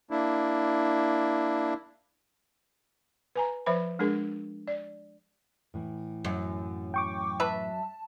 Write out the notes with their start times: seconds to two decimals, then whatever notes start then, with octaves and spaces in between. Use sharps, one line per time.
0.11 A#3 D4 E4
3.35 B4 G#5 A#5
3.66 F3 B4 C5 E5 B5
3.99 G#3 D4 G#4 A#4
4.68 D5
5.74 A2 E3
6.25 F#2
6.94 G5 C#6 D6
7.40 B4 E5 A5